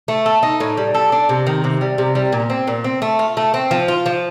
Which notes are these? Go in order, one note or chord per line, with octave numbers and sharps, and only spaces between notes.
A3
A4
D#4
A2
G3
A4
D4
C3
D#3
C3
G3
C3
G3
A#2
C4
A#2
C4
A3
F4
A3
C4
F3
F4
F3